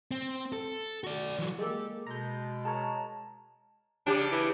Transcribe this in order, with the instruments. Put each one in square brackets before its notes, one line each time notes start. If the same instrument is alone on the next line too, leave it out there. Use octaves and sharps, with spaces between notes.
[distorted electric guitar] C4
A4
F#4 D5
E3 F#3
[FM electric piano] G#3 A#3 [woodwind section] G4 A4
[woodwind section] B2 G#3 [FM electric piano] A#5 G6
[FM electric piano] G#4 A#4 C#5 [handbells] A5 A#5
[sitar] C#3 G4 [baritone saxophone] D4
[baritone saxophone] E3